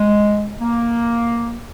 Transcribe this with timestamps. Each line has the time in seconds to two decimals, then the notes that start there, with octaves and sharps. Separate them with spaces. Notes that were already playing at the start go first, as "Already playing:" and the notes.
Already playing: G#3
0.61 A#3